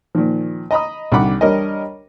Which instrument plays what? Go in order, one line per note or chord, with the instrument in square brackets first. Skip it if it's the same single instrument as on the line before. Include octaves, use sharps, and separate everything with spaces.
[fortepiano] A#2 D#3 F3
D#5 A#5 B5 D#6
C2 D3 D#3 F#5 B5 D6
G3 D4 A#4 C#5 D#5